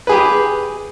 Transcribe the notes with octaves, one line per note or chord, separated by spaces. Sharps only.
G4 G#4 B4